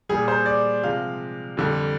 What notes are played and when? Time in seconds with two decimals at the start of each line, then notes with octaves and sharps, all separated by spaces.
0.09 A#2 G3 G#4
0.28 C5
0.46 D5
0.83 C3 F3 G#3 F5
1.57 F2 D3 G3